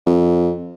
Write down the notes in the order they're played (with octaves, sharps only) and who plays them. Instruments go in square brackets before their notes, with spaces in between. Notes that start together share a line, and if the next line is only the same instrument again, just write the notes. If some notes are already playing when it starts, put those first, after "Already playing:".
[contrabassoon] F2